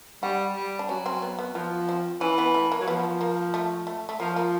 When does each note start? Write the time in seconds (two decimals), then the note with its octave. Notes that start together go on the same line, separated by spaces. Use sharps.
0.23 G3 F#4
0.56 G3
0.79 D4
0.89 F#3 C#4
1.06 C4
1.22 B3
1.39 B3
1.55 F3 B3
1.89 C4
2.21 E3 C#4
2.38 B3
2.54 A3
2.72 A#3
2.81 F#3
2.87 F3 B3
3.21 A#3
3.54 A3
3.87 A3
4.09 A3
4.20 F3 A#3
4.36 A#3